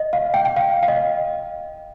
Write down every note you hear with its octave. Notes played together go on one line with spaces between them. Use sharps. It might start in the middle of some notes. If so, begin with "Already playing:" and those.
Already playing: D#5
F5
G5
G5
F5
F5
D#5